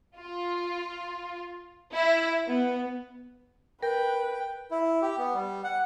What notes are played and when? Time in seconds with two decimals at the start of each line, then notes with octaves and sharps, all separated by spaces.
0.18 F4
1.94 E4
2.48 B3
3.83 A#4 B4 G5
4.71 E4
5.02 G4
5.18 B3
5.34 G3
5.64 F#5